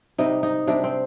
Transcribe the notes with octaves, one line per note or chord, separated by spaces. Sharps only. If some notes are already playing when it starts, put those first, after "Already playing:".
C3 G3 D#4
D#4
C3 G3 D4
C4